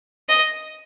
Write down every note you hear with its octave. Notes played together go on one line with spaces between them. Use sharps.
D#5